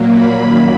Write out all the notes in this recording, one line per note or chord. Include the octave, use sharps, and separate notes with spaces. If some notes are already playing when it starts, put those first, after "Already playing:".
Already playing: A#2 F#3 A#3
B5
F#2 D#3 F#3 A#3